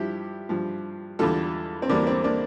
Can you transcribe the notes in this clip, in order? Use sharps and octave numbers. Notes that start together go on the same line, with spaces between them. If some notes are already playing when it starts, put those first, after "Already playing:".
Already playing: G2 F3 E4 G4
G2 F3
E2 D3 G3 F4 A4
C4
E2 D3 G3 A#3 D4
C4
A#3 D4